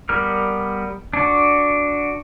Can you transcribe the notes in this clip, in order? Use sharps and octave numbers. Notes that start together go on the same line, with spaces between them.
G3 B3 A#4 F6
D4 F#4